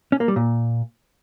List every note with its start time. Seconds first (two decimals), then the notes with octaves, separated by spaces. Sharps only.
0.12 C#4
0.20 A#3
0.28 G3
0.36 A#2